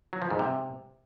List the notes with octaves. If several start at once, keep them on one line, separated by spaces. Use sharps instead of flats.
F#3
F3
G#2
C3